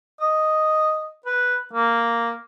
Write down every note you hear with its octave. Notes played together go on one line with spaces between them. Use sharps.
D#5
B4
A#3